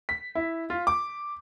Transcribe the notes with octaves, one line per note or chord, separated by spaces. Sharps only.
B6
E4
F4
D6